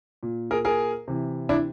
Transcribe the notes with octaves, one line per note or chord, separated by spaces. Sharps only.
A#2
G#4 A#4
G#4 A#4
C3 E3
D4 E4